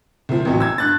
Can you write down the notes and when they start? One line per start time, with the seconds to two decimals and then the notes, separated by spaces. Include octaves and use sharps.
0.29 C2 F3
0.45 A1 E2 C3 E3 F#3
0.60 E6 G#6
0.78 G2 F#6 A6